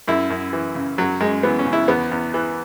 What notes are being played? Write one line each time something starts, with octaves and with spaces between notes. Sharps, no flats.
F#2 E4
F#2
E3
C#3
F#2 F#3
F#2 G#3
E3 B3
C#4
C#3
E4
E2 B3
E2
E3